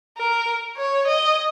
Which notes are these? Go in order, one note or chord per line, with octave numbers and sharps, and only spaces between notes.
A#4
C#5
D#5